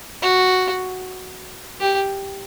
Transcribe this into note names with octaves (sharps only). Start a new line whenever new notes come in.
F#4
G4